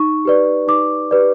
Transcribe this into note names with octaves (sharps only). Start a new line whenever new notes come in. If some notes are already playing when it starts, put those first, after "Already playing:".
Already playing: D#4 C#6
G4 B4 D5
D#4 D6
G4 B4 D5